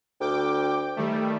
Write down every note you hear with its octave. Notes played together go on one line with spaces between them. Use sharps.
D2 G5 D6
D#3 G3 A3